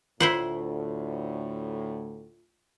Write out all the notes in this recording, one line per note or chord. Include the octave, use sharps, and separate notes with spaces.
D2 A2 E4 F4 C5 F#5